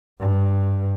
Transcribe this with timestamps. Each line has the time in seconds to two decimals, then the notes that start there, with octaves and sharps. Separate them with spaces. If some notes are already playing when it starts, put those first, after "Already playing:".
0.20 G2